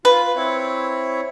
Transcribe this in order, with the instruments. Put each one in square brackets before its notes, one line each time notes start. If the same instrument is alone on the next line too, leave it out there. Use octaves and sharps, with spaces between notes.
[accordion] F4 [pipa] B4
[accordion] C4 E4 C#5